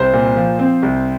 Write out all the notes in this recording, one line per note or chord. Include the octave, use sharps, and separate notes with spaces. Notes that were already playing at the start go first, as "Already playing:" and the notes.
Already playing: C2 C5
A#2
F3
C4
C2